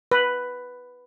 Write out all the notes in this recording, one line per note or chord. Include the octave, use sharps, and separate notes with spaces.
B4